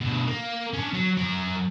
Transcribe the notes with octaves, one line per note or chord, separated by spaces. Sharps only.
D2 B2
A#3
C#4 D4
F#3
F#3 A#4